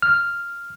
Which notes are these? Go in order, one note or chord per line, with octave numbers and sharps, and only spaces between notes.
F6